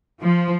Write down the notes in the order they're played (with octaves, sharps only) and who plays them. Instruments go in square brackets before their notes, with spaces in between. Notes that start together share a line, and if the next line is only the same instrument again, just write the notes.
[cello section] F3